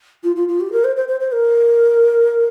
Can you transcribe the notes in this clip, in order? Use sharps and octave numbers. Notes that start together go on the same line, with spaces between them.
F4
F4
F4
G4
A#4
C5
C5
C5
C5
A#4